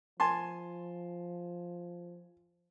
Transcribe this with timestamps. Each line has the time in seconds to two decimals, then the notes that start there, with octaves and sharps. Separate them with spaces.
0.20 F3 G#5 A5 C6